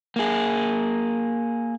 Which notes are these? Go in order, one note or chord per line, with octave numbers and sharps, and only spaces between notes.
A#3 G#4